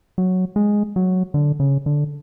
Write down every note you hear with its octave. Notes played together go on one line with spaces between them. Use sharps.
F#3
G#3
F#3
D3
C#3
D3